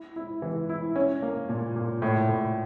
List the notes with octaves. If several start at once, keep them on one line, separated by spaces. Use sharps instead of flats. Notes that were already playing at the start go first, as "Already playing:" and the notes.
Already playing: E4
E4
E3
E4
C#4
A#3
A#2
A#2
A2
A2